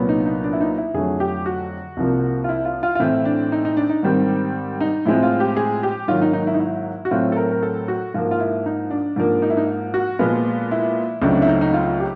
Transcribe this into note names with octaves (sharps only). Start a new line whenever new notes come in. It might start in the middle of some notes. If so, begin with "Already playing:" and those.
Already playing: C2 A#2 F#3 B3
D#4
D#4
D4
E4
D#4
E4
F2 D3 F#3 A3 G#4
G4
F#4
C2 C3 F3 A#3
F4
E4
F4
F4
F4
A2 E3 A3 C4 E4
D4
D#4
D#4
D4
D#4
G#2 D#3 G3 C4
D#4
A2 F3 G#3 C4 E4
F4
G4
G#4
G4
G#2 D#3 F#3 A#3 F4
D#4
D#4
E4
D#4
E4
F#4
A2 F#3 A3 C4 F4
A4
A#4
A#4
A4
F#4
G#2 F3 A#3 F4
F4
E4
D#4
D4
G#2 F3 A#3 D4
D#4
E4
D#4
F#4
A#2 F3 G#3 B3 F4
E4
C#2 C#3 F#3 A3 C4 D4
D4
E4
D#4
D#4
F4
G4